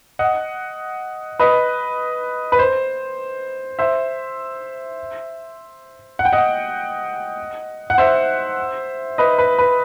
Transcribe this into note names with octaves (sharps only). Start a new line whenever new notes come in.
D#5 F#5
B4 D#5
B4
C5
C5 E5
F#5
G5
D#5 F#5
F#5
C5 E5
B4 D#5
B4
B4